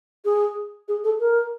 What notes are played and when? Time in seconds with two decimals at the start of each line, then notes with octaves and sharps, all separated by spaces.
0.25 G#4
0.88 G#4
1.04 A4
1.20 A#4